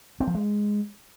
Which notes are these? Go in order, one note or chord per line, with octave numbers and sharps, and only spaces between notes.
C4
F3
G#3